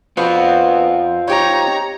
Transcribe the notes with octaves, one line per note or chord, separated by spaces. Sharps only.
B3 C4 D4 F4 F#4
D#4 G4 C#5 A#5